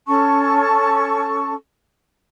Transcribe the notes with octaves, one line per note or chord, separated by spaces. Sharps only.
C#4 A4 A5 C#6